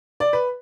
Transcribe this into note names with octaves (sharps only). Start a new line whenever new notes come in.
D5
B4